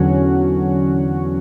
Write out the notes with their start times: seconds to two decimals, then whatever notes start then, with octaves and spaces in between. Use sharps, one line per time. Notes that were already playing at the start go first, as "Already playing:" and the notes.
Already playing: E2 D3 F#3 C#4 F#4